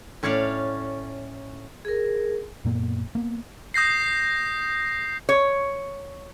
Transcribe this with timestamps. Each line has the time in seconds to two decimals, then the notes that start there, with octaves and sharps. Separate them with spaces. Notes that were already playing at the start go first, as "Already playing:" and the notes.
0.23 A2 C#4 C#5 D5 F5
1.85 G#4 A#4
2.65 F#2 A#2 A#3 B3
3.15 A#3 B3
3.74 D#6 G6 A#6 C7
5.29 C#5